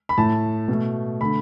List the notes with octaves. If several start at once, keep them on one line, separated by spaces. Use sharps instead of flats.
B5
A2 A3 A5
B2 A3
D3 A3 B5